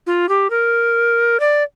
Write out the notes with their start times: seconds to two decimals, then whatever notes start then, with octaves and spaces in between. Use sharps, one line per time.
0.07 F4
0.29 G4
0.50 A#4
1.40 D5